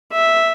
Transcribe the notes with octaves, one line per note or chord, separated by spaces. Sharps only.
E5